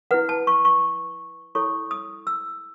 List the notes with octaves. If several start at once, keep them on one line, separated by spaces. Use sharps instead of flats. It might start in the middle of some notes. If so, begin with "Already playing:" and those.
E4 B4 F#5
A5
C#6
C#6
E4 A4 C#5 C#6
D#6
E6